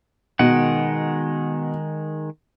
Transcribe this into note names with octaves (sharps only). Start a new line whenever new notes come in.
B2 D#3 G#3 F#5